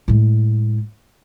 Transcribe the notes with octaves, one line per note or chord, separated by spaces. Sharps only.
A2 G#3